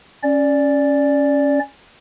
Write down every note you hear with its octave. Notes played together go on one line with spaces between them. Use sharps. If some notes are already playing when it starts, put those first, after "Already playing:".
C#4 D5